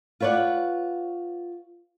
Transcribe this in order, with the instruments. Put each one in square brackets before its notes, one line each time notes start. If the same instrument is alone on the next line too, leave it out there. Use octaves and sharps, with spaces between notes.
[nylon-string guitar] F4 B4 C#5 D5 F#5